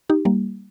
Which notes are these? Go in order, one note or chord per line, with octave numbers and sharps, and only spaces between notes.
D#4 G4
G3 A#3